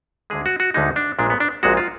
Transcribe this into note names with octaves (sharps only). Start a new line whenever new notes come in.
D2 D3 G#3 G#4
F#4
F#4
D2 D3 G#3 D#4
D4
A#1 A#2 G#3 D4
B3
D4
A#1 A#2 G#3 F#4
F4